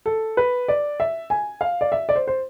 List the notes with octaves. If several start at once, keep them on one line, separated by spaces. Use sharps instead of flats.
A4
B4
D5
E5
G#5
F5
D5
E5
D5
C5
C5